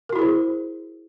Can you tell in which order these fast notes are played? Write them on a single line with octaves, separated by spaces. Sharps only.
A#4 F#4 E4 G#4 C5